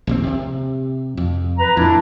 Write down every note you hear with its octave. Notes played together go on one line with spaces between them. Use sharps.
A#1 D#2 C4
C3
F2
B4 A#5
F2 A2 D4 E4